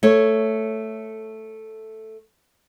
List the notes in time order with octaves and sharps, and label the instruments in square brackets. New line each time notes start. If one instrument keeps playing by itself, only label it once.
[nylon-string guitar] A3 C#5